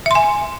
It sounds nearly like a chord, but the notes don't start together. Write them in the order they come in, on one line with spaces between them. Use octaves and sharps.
E5 C6 G#5